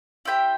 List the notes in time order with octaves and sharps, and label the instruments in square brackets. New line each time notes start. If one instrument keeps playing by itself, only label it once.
[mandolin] E4 G4 C5 G5